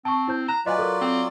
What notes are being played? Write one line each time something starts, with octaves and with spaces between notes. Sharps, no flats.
C4 A5 C#6
E4 C5 G6
A#5 F#6 E7
F#3 F4 B4 D5 D#5 G#5
A4 A#4
C4 A4